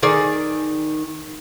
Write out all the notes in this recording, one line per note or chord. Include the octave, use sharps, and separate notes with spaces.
D#3 G#4 D5